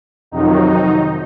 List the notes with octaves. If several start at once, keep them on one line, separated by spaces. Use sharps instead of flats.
F2 C3 D#3 F#3 D#4